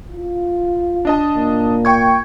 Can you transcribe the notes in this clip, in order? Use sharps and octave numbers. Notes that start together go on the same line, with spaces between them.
F4
D4 D#5 A5
A#2
G5 C#6 G#6